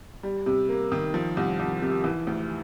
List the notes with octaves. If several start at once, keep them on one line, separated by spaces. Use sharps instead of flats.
G3
C3
A#3
D#3
F3
C2
C2
C3
E3
D2